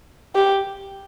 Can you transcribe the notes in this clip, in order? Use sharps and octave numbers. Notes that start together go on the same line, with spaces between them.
G4